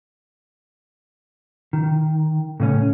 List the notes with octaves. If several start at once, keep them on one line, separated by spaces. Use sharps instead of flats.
D#3
A2 C#3 C#4